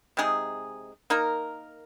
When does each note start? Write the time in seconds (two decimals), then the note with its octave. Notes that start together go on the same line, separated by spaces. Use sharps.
0.17 C3 G#3 D#4 G#4
1.10 A#3 D#4 A#4